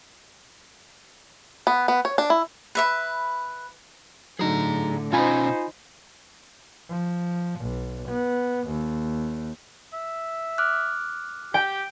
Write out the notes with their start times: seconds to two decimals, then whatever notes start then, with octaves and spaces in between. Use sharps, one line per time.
1.67 B3
1.88 B3
2.05 C#5
2.18 D4
2.30 E4
2.75 B4 E5 B5
4.39 A2 D3 F#3 D#4 G#4 A#5
5.13 B2 C#4 D#4 F4 C5 G#5 A#5 B5
6.90 F3
7.61 B1
8.09 B3
8.68 D#2
9.93 E5
10.58 D6 F6 F#6
11.54 G4 G5